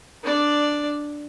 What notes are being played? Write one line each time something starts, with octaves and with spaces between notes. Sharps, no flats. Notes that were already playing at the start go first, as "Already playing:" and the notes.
D4 D5